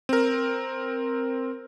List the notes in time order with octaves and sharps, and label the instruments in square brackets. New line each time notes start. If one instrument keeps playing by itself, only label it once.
[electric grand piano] C4 A#4